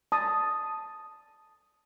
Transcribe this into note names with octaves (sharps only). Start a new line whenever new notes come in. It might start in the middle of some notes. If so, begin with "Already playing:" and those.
A5 D#6